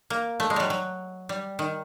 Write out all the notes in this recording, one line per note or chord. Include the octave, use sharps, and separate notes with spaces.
A#3
A3
G#3
F#3 G3
F#3
G3
D#3